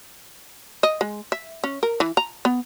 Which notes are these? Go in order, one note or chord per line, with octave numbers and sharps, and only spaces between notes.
D#5
G#3
E5
C#4
A#4
E3
A#5
B3